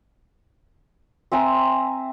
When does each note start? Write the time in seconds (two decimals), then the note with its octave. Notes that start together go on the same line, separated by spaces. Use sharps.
1.32 C4 E5 G#5 A#5